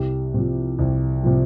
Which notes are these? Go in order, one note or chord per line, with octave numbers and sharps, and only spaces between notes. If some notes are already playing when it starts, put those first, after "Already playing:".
Already playing: C2 G4
C3 F3
C2
C3 F3